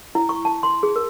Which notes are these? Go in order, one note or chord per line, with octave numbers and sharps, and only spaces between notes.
E4
C#6
A5
C6
G#4
A#4